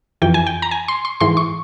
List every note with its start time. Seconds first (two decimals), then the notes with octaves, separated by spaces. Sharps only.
0.22 F2 E3 G5
0.34 G#5
0.46 G5
0.62 A#5
0.71 G#5
0.88 C6
1.05 C6
1.20 G#2 E3 C6
1.37 C#6